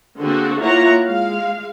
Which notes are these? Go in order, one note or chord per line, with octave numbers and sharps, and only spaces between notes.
D3 A#3 C4 F#4 G#4 A4
A#3 E4 F4 C#5 F#5 A#5
G#3 F5